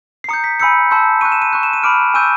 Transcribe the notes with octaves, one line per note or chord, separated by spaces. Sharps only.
C7
A#5 D#6 G6 C#7
B6
G#5 B5 E6 G6 C#7
A5 C6 E6 G6
C#6 F#6 D#7
E7
D#7
C#6 F#6
E7
D#7
B5 D6 F6 D7
G#5 C#6 E6 G6 D#7